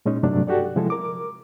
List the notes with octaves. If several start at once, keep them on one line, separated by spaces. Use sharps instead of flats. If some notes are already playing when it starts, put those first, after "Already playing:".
A#2 G#3 C#4 D#4
G2 C3 F#3 A3 D4
F#4 G4 A4 D5
C3 F3 G#3 E4 A4
A#4 D6